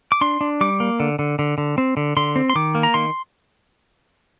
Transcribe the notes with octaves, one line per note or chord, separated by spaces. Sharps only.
D6
D4 C6
D4
G3 D6
A#3
D3
D3
D3
D3
C4
D3
D3 C6
C4
C6
D#3 D6
A#3
A#5
D#3 C6